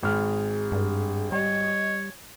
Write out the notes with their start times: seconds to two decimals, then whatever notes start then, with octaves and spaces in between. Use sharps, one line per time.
0.03 G#1 G#4 F6
0.72 G2
1.32 G3 C#5 D#5